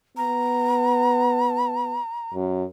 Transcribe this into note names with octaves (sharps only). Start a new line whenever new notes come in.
B3 A#5
F#2